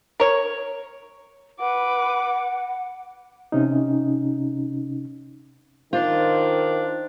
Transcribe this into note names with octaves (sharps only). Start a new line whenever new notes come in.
A#4 C#5
B4 F#5 D6
C3 C#4 D#4
D#3 D4 F4 C5